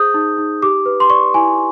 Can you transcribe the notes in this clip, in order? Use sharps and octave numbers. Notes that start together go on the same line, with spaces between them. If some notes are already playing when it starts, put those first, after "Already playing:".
Already playing: G#4 C5 D#6 G6
D#4
D#4
G4 D6
B4
C6
D5 C#6
E4 G#5